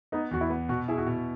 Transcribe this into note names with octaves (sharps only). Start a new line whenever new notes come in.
B3 D#4
E2 F#4
E4
B3
B2 F#4
E4 G#4
F#4
B2